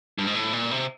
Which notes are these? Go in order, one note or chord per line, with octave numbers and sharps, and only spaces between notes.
G2
G#2
A2
A#2
C3